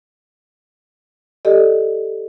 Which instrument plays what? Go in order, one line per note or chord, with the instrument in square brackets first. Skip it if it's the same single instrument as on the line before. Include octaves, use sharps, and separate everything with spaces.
[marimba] G4 A4 D5 D#5